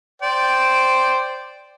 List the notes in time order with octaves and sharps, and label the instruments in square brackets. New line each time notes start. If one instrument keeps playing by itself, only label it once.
[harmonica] C5 D5 G5